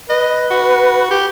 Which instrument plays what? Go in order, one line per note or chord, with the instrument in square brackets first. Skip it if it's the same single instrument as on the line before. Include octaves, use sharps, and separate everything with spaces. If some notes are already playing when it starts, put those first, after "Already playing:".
[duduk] B4 [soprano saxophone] D#5
[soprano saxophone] F#4
G4